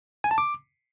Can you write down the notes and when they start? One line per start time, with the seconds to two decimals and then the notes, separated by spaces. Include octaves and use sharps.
0.24 G#5
0.31 A5
0.38 D6